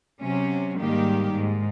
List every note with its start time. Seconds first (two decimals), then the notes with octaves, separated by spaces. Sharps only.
0.21 C3 F#3 C#4
0.79 G#2 D#3 G3 A#3 G4
1.34 G#2